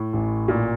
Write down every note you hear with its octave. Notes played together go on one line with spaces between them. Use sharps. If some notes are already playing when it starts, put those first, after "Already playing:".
Already playing: A2
A1
A#2